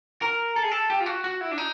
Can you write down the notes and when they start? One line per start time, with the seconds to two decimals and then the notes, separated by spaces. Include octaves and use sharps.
0.22 A#4
0.56 A4
0.63 G#4
0.71 A4
0.90 G4
1.00 F4
1.06 F#4
1.24 F#4
1.41 E4
1.51 D4
1.58 D#4